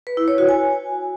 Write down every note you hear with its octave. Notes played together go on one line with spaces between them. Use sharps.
B4
E4
C#5
F#4
G#5